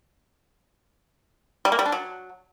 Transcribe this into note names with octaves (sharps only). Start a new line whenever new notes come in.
G3
A#3
G3
D4
F#3